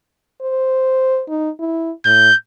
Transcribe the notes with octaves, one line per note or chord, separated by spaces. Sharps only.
C5
D#4
E4
A2 G6